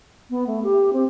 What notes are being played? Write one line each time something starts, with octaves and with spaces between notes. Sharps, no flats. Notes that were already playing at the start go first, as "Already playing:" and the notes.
B3
A3
G4
C4